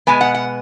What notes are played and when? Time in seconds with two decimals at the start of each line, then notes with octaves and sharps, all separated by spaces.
0.07 B2 G#3 B3 G#5
0.21 F#5
0.35 F#5